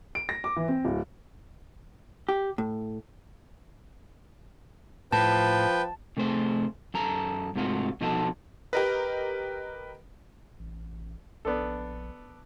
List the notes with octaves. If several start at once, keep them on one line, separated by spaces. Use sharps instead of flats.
D7
A#6
D6
E3
C4
D1
G4
A2
A2 F3 B4 G5 A5
C3 A3 G#4 C5
F#2 A4 A#5
G#2 C3 A3 F4 F#4
B2 F3 D#4 F4 F#4 A4
G4 A#4 B4 D#5
A1
A#1 B3 D4 A4